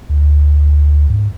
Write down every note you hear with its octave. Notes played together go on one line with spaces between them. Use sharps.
D2
G#2